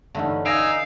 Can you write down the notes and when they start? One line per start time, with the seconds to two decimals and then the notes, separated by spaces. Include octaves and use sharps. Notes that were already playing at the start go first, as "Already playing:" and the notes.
0.15 G2 D3 E3 A3 C#4 D#4
0.45 D#4 F5 G#5 E6 G#6 A#6 D7